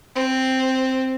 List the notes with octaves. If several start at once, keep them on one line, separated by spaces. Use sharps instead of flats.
C4